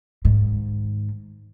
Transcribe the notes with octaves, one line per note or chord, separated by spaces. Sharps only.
G#2 D#3